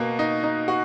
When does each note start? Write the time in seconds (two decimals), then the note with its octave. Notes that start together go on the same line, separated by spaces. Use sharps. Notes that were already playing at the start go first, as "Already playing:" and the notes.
Already playing: B2 A#3 F#4
0.19 D#4
0.43 D#4
0.68 F#4